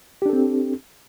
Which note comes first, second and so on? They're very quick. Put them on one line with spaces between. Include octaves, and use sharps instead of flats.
G4 D4 A4 C4